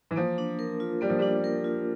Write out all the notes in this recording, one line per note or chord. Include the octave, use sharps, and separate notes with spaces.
E3
F3 A#3
D4
A#4
F4
G3 A#3
F3
G3 D4
A#4
F4